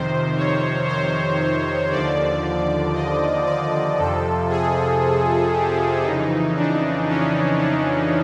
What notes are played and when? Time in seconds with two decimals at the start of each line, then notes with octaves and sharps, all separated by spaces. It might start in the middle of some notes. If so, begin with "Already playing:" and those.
Already playing: F2 C3 D#3 C5
0.37 C#5
0.88 C5
1.91 D#2 D3 F3 D5
2.94 D#5
3.46 D5
3.98 F2 C3 F3 A4
4.50 G#4
5.52 G4
6.04 F2 C#3 E3 D#4
6.56 D4
7.08 C#4
7.59 D4